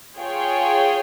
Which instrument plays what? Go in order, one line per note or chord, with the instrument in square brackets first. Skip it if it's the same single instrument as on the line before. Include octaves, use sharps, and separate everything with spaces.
[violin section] F4 G#4 C#5 G5